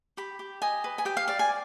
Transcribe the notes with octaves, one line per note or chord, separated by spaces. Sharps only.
G4 B5
G4
D#5 G#5
B4
G#5
G4 G5
F5
D5 F5
G#5